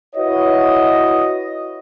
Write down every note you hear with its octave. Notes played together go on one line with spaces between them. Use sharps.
E4 F#4 B4 C#5 D#5